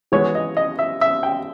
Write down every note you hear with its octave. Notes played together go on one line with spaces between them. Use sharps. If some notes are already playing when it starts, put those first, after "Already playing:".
E3 G#3 B3 C#5
D#5
D#5
E5
E5
G5